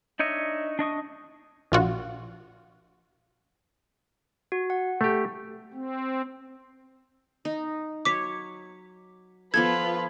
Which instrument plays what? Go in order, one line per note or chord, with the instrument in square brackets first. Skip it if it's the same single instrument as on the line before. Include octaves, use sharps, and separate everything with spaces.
[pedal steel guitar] D4 D#4 C#5 D#5 E5
D4 D#5 C#6 D#6
[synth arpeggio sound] A#1 F4 F#4
[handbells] F#4
F#5
[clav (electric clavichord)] A3 G4
[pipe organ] C4
[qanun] D#4
[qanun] F#3 C#5 [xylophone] D6 B6
[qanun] F3 B3 A4 [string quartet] F4 B4 [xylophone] G#6